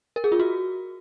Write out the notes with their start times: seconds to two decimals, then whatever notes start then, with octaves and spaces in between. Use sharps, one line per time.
0.16 A#4
0.24 G#4
0.32 F4
0.39 F#4